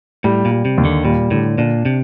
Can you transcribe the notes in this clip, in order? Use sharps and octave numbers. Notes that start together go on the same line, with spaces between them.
A2 G3
A#2
G3
C3
D#2
D3
A#2 G3
A2 D3
A#2 D4
C3